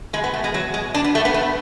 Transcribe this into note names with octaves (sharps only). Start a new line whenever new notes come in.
B2 G#3
B3
A3
G#3
F#3
G#3
D4
B3
A3
B3
A3